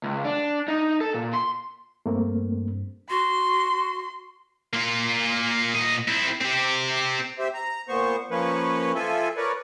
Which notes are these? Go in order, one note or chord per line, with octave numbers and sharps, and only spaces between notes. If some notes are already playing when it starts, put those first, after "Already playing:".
C#2
D4
D#4
A4
A#2
C6
G2 A3 A#3 C4
F#4 C6
A#3 F4
A#2 D#5
C4 E4
C4 G4
C4 G4 C5 E5
A#5
A#2 B3 C5 C#6
F3 A#3 C#4 B4 C#5
F3 F4 A4 E5 G#5
A#4 B4 C#5 D5